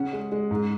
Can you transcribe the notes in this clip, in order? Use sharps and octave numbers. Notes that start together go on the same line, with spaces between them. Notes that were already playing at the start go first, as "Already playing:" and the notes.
Already playing: C#3 C#4 F#5
G#3
G#3
G#2